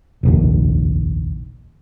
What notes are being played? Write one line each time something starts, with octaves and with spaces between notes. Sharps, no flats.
F1 A#1 D#2